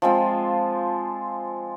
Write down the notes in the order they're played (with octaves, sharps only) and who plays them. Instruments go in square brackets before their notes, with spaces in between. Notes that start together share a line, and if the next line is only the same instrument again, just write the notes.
[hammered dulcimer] F3 G#3 C4 F4